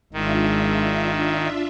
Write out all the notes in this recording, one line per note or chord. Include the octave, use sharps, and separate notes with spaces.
G#1 D#3 G#3 D4 F4 E5